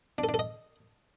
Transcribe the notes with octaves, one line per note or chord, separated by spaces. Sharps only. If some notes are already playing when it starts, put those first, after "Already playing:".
D4
A4
D4
A4
D#5